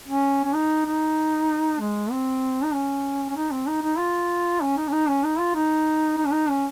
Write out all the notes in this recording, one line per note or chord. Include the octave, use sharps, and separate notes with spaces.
C#4
C#4
D#4
D#4
G#3
C4
D#4
C#4
C#4
D#4
C4
D#4
D#4
F4
C#4
D#4
C#4
D#4
C#4
D#4
F4
D#4
D#4
C#4
D#4
C#4